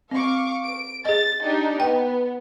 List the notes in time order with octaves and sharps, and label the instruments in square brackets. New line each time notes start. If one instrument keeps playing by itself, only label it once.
[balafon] C4 [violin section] F5 C#6 D6
[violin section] D7
[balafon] G#4 D#5 [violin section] A6
[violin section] D4 D#4 G4
[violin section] B3 [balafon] G5